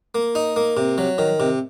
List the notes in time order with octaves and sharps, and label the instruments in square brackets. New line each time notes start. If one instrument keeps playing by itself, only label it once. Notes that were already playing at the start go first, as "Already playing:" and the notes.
[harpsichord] A#3
D#4
A#3
C3
F#3
D#3
C3